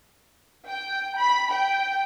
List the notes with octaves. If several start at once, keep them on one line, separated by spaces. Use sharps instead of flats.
G5
B5
G5